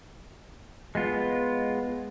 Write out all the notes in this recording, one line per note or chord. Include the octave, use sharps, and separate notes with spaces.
G#3 B3 F4